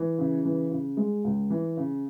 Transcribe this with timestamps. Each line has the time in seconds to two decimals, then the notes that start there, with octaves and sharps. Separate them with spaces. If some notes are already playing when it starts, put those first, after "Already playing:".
Already playing: E3
0.18 C#3
0.45 E3
0.71 C#3
0.97 G#3
1.24 C#2
1.50 E3
1.77 C#3